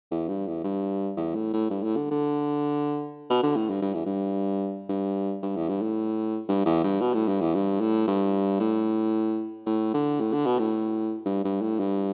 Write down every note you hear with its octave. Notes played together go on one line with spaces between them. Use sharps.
E2
G2
E2
G2
E2
A2
A2
G2
A2
D3
D3
B2
D3
A2
G2
G2
E2
G2
G2
G2
E2
G2
A2
G2
E2
G2
B2
A2
G2
E2
G2
A2
G2
A2
A2
D3
A2
D3
B2
A2
G2
G2
A2
G2